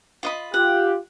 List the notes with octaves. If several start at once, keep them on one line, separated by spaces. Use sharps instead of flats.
F4 D#5 B5
F4 G4 F#5